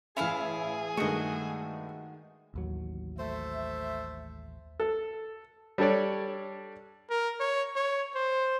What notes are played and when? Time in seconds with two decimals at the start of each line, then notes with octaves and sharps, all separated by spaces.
0.17 A1 C#4 E4 G#4 E5 F5
0.97 G2 D#3 G#3 A3 F#4 D#5
2.54 A1 D#2 F#3
3.17 A3 C5 E5
4.80 A4
5.78 G3 D4 A4 C#5 D5
7.10 A#4
7.40 C#5
7.76 C#5
8.15 C5